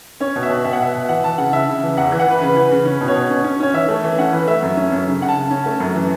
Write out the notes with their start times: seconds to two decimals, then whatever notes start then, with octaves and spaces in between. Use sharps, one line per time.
0.20 C#4 C#5
0.36 B2
0.43 E5
0.49 B2
0.65 B2 E5
0.73 F#5
0.80 B2 E5
0.95 B2
1.09 E3 F#5
1.24 E3 A5
1.38 C#3 F#5
1.53 C#3 E5
1.68 C#3
1.83 E3
1.97 E2 F#5
2.12 E3
2.20 F#5
2.27 E3 B4
2.41 C#3 B4
2.57 E3
2.71 C#3
2.85 C#4
3.01 B2
3.08 C#5
3.15 B2
3.30 C#4
3.44 C#4
3.60 C#4 C#5
3.73 E3 E5
3.89 A3
4.04 E3
4.18 C#4 F#5
4.33 E3 B4
4.48 A3 E5
4.62 F#2
4.77 C#4
4.92 F#2
5.07 C#3
5.21 C#3 F#5
5.29 A5
5.36 C#3
5.50 C#4
5.66 A3
5.80 F#2
5.95 E3